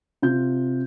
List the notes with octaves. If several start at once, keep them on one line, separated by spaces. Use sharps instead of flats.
C3 F4 G6